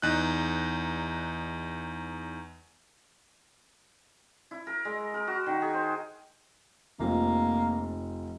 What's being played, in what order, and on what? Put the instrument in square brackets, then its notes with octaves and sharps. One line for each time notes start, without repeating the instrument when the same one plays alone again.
[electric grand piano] E2 D#4 F#6
[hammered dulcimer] E4
A#4
G#3
A#4
F#4
D#3
G#4
C5
[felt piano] F1 F3 [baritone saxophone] A#3